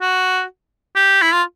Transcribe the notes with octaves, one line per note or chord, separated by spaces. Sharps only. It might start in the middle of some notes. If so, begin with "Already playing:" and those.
F#4
G4
E4
F4